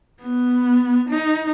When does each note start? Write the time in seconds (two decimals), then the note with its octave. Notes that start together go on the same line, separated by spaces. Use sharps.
0.22 B3
1.09 D#4